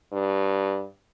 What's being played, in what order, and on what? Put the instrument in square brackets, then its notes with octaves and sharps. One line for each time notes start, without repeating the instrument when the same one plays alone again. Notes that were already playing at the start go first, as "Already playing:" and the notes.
[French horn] G2